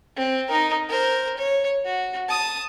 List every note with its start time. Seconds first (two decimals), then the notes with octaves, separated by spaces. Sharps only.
0.16 C4
0.48 D#4 A#4
0.89 A#4 C5
1.37 C#5
1.85 F#4
2.28 A5 D#6